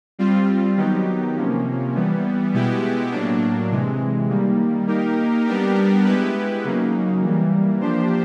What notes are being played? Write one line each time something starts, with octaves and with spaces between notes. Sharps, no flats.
G3 C4 F4
D#3 F#3 B3 D#4 G4
C3 F3 A#3 C#4
E3 G3 B3
B2 G#3 B3 E4 G4
A2 F#3 A#3 D4
C3 E3 G#3
D#3 G3 A#3
A#3 D#4 G4 A#4
G3 B3 D4 G4 A#4
G#3 B3 E4 G4 B4
C#3 F#3 A#3 D#4
E3 G3 A#3
F3 A#3 D4 G4 C5